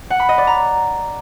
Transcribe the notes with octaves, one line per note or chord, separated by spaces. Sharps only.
F#5
B5
D#5
D5
A#5